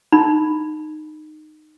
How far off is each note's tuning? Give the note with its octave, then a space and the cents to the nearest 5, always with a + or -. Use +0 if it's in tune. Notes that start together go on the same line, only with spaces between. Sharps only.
D#4 -20 B5 +0